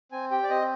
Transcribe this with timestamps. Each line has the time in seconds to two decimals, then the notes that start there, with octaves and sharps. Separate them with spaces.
0.12 C4 G#5
0.31 G4 G5
0.43 D5
0.50 C4 D#5